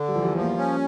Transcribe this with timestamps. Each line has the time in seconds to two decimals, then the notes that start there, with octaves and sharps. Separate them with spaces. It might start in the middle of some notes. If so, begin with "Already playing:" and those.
Already playing: D3
0.08 G3
0.14 E2 F3
0.24 G3
0.35 F3
0.41 A#3
0.57 C#4